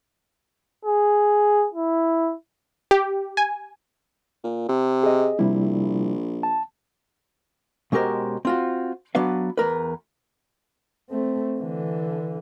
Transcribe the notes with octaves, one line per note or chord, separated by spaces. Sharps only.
G#4
E4
G4
G#5
A#2
C3
G#4 D#5
A#1 C3 G3 E4
A5
B2 G#3 C#4 G4 A#4 C5
C4 F4 F#4
F#3 B3 D4 B4 F5
E2 A#4 B4
A3 C4
D3 E3